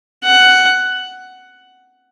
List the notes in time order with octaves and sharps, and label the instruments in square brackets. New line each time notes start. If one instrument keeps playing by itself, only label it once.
[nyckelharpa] F#5